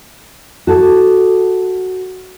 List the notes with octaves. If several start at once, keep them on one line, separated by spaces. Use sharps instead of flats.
F#4 A4